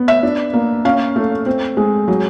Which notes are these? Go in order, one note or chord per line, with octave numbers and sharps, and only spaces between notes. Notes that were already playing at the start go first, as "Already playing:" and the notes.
Already playing: B3
E5
D4
A#3
C#4 F5
A3
C4
G#3
F#3